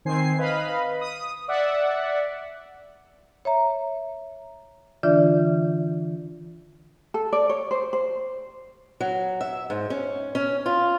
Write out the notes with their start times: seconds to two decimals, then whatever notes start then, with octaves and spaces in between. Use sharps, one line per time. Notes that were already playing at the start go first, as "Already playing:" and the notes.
0.05 D#3 C4 G#5 C7
0.38 B4 D#5 F5 B5
1.01 D#6
1.48 D5 E5 F#5
3.45 C#5 E5 A#5
5.03 D3 E3 D4 F4 D5 E5
7.14 A4
7.33 D5
7.49 C#5
7.71 C5
7.93 C5
9.00 F#3
9.41 E5
9.70 G#2
9.90 C#4
10.35 C#4
10.66 F4